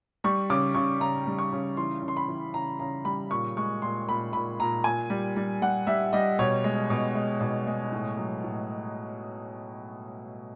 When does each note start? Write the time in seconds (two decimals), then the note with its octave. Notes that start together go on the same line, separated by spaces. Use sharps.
0.24 G3 C#6
0.50 C#3 D6
0.75 C#3 C#6
1.00 C#3 A#5
1.27 G3
1.39 C#6
1.52 C#3
1.77 E3 C6
2.03 C#3
2.08 C6
2.17 B5
2.28 E3
2.54 C#3 A#5
2.79 C#3 A#5
3.05 G3 B5
3.31 A#2 C#6
3.57 G#3 C#6
3.82 A#2 C6
4.09 A#2 B5
4.33 A#2 B5
4.60 A#2 A#5
4.84 A#2 G#5
5.10 G3
5.36 G3
5.62 G3 F#5
5.87 G3 E5
6.13 G3 D#5
6.39 B2 C#5
6.64 G#3
6.90 B2
7.15 G#3
7.41 B2
7.67 G#3
7.92 A2
8.17 F#3
8.44 A2